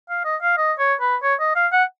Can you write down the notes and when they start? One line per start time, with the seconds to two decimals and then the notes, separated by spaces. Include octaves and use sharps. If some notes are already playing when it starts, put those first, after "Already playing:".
0.10 F5
0.25 D#5
0.42 F5
0.58 D#5
0.79 C#5
1.01 B4
1.23 C#5
1.40 D#5
1.56 F5
1.72 F#5